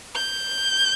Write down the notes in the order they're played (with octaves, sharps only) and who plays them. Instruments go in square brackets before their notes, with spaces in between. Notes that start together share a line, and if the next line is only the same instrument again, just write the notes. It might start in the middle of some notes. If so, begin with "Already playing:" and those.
[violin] G6